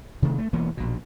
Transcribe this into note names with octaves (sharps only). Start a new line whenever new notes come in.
C3 D#3 E3 A3
A3
E1 E3 A#3 B3
A#1 B2